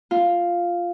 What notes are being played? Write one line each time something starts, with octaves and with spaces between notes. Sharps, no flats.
F4